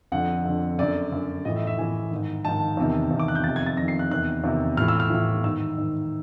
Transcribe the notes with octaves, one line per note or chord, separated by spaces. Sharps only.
F2 D3 F#5
F2 D3
F#2 D3 D5
F#2 D3
A2 E3 D#5
E5
E5
A2 E3 G#5
G#2 D#3
G#2 D#3 A5
E2 C3 D#3
E2 C3 D#3
D6
F#6
G6
F2 C3 D#3 A6
G#6
A6
F2 C3 D#3 A#6
C7
F#6
E2 C3 D#3 F#6
E2 C3 D#3
A2 E3 F6
E6
F6
A2 E3
G#2 D#3 E6
G#2 D#3